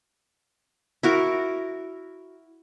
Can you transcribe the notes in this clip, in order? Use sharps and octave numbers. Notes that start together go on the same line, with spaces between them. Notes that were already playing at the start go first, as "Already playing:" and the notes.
E4 F#4 A#4